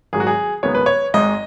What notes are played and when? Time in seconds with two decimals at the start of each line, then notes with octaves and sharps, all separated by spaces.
0.13 G#1 G#2 D#3 F#3 G#4
0.20 F#4
0.27 G#4
0.63 F#1 F#2 D#3 G#3 B3 C#5
0.75 B4
0.86 C#5
1.14 G#1 G#2 G#3 D#5